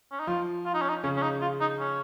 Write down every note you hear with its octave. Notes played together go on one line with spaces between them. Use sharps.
C#4
D#4
F3 F4
F4
D#4
C#4
D#4
C#3 C#4
C#4
D#4
F4
D#4
C#4